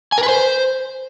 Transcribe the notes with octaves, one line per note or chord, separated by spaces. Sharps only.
G#5
A#4
B4
C5